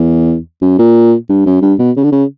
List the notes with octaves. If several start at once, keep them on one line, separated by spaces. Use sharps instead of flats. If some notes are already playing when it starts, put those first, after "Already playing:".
Already playing: E2
F#2
A#2
G2
F#2
G2
B2
C#3
D3
C#3